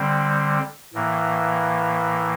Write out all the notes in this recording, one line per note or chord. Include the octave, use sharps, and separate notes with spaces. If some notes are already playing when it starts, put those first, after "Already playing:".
Already playing: D3 G3 C4
A2 E3 A#3